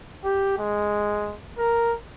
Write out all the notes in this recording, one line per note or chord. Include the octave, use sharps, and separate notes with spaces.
G4
G#3
A#4